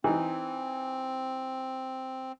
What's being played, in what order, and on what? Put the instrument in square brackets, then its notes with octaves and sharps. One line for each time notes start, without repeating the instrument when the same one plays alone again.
[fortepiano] E3 D#4 [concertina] C4